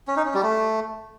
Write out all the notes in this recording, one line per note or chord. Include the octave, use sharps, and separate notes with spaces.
C#4
D#4
C#4
G3
A3